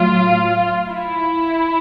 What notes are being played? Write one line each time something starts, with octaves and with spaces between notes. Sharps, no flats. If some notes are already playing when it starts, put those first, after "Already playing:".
Already playing: A2 F#3 F4
E4